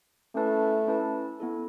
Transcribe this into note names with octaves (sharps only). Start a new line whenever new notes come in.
A3 C#4 E4 B4 A5
C#4 E4 B4 A5
B3 E4 A4